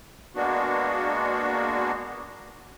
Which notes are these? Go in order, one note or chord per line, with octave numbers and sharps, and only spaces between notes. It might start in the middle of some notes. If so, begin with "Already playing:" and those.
G#3 A#3 B3 D4 F#4